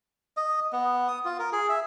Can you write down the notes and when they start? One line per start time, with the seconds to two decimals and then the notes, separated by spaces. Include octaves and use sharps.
0.37 D#5
0.73 B3
1.08 D#6
1.25 F4
1.39 A#4
1.52 G#4
1.69 E5